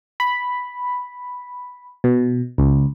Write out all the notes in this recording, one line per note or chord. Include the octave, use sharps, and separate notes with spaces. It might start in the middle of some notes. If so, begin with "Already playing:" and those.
B5
B2
C#2